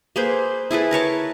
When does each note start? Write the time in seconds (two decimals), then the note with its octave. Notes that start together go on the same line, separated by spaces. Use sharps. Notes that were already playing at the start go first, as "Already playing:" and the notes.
0.16 A#3 G#4 B4 C5
0.71 E4 G#4 A4 B4
0.91 A#4 B4 C#5 A5